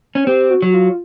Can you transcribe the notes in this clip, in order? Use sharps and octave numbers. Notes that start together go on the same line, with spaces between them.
C#4
C4 G4
F#4
F#3
F#4
F4